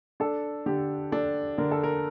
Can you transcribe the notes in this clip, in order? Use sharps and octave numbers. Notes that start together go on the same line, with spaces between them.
D4 A4
D3 G4
D4 A4
D3 A#4
A4
A#4